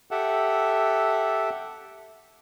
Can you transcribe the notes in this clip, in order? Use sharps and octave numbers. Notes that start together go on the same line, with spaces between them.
G4 A4 E5 F#5